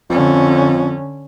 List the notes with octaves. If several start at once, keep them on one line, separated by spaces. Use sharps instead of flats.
F2 D3 C#4